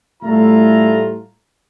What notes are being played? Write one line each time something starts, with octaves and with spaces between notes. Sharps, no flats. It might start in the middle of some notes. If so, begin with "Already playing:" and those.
A2 G3 A3 E4 F4 A#5